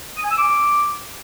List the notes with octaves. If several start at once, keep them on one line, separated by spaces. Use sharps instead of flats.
D#6
G#5
E6
D6